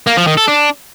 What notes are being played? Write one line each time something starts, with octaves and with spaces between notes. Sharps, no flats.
A#3
F3
D#3
A4
D4